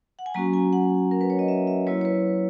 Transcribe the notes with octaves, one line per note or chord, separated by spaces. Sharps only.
F#5
G#5
F#3 A#3 C#4 F#4 A#5
G#5
F#5
A#4
B4
C#5
D#5
E5
E5
F#3 A#3 E4 C#5
C#5
B4